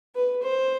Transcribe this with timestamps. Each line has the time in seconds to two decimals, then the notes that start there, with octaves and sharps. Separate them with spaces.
0.15 B4
0.43 C5